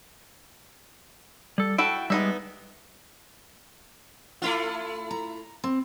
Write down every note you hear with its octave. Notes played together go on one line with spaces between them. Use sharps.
G3 A4
E4 F#4 A4 G5
G3 G#3 B3 D#4 E5
A3 E4 F4
A#5
C4